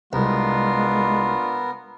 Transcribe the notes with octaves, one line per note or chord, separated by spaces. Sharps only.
C2 G#3 B3 D4 F4 A#4